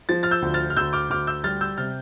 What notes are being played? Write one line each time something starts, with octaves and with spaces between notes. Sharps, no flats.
F3 A6
F6 A6
E6 G6
D2
F6 A6
F6
D2 E6 G6
D6 F6
D2 D6 F6
E6 G6
G3 F6 A6
E6 G6
C3 F6 A6